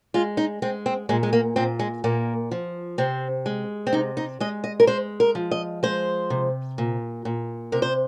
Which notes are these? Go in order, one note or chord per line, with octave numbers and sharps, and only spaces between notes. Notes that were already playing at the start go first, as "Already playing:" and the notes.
G#3 F4
D#4
G#3 C4
C4
A#2 G#3
G#3
A#3
A#2 C4
G#3
A#2 A#3
F3
C3 C4
G#3
C4
C3 D#4
D#4
G#3 D#5
D#5
A#4
G#3 C5
A#4
F3
D#5
G#3 C5
C3
A#2
A#2
C3 A#4
C5